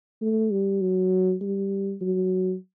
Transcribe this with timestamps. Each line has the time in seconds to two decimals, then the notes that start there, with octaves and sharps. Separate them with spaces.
0.21 A3
0.51 G3
0.81 F#3
1.41 G3
2.01 F#3